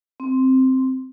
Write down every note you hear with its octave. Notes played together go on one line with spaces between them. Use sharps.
C4